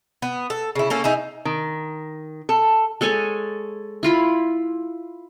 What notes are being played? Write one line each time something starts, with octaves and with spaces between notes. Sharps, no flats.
B3
A4
C#3 E4
A#3 C#4 A4
D#4 G#4 E5
D#3
A4
G#3 A4 C#5 G#5
E4 F4 B5